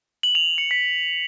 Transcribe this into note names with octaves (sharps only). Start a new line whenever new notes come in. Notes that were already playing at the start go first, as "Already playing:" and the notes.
F#7
F7
C#7
B6